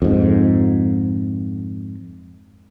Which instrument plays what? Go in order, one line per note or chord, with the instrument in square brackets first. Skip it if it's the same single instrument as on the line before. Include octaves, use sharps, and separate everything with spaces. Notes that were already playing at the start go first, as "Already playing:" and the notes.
[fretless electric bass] F2 G#2